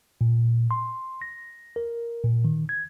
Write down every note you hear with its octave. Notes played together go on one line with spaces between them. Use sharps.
A#2
C6
A#6
A#4
A#2
D#3
G#6